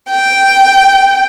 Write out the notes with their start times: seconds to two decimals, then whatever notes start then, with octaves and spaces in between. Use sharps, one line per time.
0.10 G5